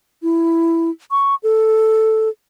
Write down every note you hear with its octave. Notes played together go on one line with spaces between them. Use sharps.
E4
C#6
A4